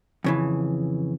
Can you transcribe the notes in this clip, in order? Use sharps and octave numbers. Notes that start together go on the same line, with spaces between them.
F2 C#3 E3